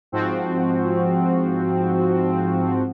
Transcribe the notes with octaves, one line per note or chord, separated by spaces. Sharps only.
G#2 F3 C4 F#4